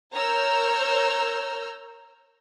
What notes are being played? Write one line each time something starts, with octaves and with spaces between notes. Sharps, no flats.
A#4 C#5 A#5 E6 F6 G6